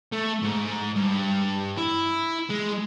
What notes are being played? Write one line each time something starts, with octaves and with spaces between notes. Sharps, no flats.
A3
G#2
G2
E4
G#3